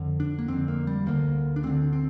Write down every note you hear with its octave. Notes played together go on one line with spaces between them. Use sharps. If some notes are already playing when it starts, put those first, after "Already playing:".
Already playing: F2 D3
D4
A#3
F2 D3 C4
A#3
G3
D2 D3 A#3
D4
D2 D3 C4
C4